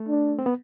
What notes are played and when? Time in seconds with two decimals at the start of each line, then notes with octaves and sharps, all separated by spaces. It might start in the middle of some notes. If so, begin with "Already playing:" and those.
Already playing: A3
0.09 D4
0.39 C4
0.46 B3